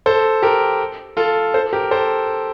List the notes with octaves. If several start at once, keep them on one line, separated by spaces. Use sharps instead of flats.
A4 C5
G4 A#4
F4 A4
A4 C5
G4 A#4
A4 C5